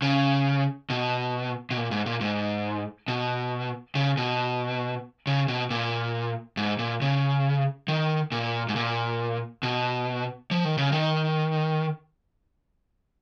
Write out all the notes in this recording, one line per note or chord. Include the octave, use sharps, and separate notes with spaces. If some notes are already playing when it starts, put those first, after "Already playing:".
C#3
B2
B2
A#2
G#2
A#2
G#2
B2
C#3
B2
C#3
B2
A#2
G#2
A#2
C#3
D#3
A#2
G#2
A#2
B2
F3
D#3
C#3
D#3